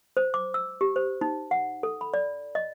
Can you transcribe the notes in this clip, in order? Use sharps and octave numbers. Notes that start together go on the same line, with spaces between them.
C5
D6
E6
G4
C5
D#4
F#5
A4
B5
D5
D#5